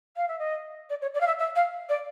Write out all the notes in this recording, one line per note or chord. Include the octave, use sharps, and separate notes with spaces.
F5
E5
D#5
D5
C#5
D5
F5
E5
E5
F5
D5